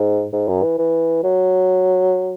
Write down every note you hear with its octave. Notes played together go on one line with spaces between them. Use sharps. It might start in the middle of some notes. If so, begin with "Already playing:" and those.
Already playing: G#2
G#2
F#2
E3
E3
F#3